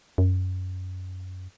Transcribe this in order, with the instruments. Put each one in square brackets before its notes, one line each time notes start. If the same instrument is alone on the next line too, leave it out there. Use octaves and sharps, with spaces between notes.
[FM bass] F#2